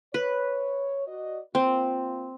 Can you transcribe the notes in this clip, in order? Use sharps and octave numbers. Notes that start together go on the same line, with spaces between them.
B4 C#5
F#4 D5 D#5
A#3 C4 F4